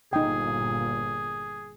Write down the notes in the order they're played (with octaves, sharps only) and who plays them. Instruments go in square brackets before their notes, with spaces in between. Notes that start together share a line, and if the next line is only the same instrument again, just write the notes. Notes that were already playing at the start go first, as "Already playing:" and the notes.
[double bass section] G1 A#2 [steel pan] D#4 G5 [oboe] G#4